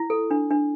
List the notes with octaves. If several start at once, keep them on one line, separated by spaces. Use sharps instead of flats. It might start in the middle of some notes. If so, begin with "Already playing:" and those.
Already playing: E4
A4
D4
D4